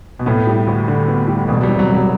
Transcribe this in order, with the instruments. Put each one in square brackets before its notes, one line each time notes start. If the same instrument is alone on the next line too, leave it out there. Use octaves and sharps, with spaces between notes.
[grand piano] B2
[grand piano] A2 [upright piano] B3
[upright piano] G3
D2
D3
B3
G3
[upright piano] E1 [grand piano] B2
[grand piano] G3
[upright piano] C3
[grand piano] F#3
[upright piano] E1
[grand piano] F#3